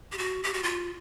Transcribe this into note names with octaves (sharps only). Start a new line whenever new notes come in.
G4
F#4
G4
F#4
F4